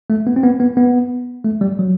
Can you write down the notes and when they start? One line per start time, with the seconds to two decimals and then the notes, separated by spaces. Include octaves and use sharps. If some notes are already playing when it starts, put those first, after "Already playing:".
0.10 A3
0.27 B3
0.36 C4
0.43 B3
0.60 B3
0.77 B3
1.44 A3
1.61 G3
1.79 F#3